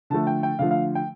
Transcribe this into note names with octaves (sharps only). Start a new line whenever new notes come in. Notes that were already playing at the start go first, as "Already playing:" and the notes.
D3 F3 A3 A5
G5
G5
D3 F3 A3 F5
F5
G5